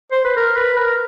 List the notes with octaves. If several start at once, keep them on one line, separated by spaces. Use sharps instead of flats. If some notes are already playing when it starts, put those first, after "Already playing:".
C5
B4
A#4
B4
A#4